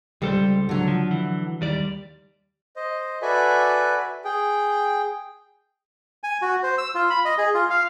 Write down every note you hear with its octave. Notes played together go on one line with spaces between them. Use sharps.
C#2 G3 A4 C5
D3 F#3
F3
E3
D#2 G3 D5
C5 D#5
F#4 A4 B4 D5 E5 G#5
G#4 G5
G#5
F#4
C5
E6
F4
B5
D#5
G#4
F4
F5